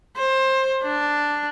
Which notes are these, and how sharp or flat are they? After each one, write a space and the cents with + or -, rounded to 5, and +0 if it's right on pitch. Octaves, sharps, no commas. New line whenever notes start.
C5 +20
D4 +0